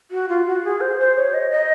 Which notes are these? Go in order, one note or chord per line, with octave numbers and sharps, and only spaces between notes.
F#4
F4
F#4
G#4
C5
C5
C#5
D#5
D#5